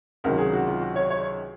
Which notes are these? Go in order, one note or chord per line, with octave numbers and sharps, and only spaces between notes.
C#2 C3 D#3 F#3 A#4
G#4
F#4
F4
F#4
C#5
C#5